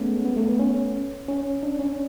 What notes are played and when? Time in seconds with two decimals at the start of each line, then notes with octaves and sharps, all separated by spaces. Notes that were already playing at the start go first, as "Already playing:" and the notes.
Already playing: G#3 A3 B3 C#4
0.25 B3
0.37 A3
0.48 B3
0.59 C#4
1.28 C#4
1.63 D4
1.79 C#4